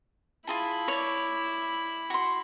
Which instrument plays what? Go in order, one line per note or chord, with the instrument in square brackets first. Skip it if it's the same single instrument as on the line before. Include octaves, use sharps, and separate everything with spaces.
[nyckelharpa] E4 B5 [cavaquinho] F4 G#4 A5
[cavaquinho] C#5 D5
F#4 C6